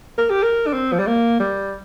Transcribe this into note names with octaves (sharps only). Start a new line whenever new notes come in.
A#4
G4
A#4
D4
C4
F3
G3
A#3
G3